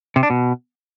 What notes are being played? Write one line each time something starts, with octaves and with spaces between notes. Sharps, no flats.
C3
D4
B2